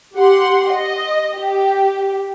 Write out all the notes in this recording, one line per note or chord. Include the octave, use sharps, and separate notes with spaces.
G4 F#5 C6
D#5
G4